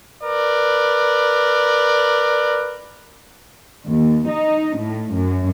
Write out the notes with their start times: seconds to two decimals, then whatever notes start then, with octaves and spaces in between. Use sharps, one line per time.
0.23 A#4 B4 D5
3.86 D#2
4.28 D#4
4.78 A2
5.14 F#2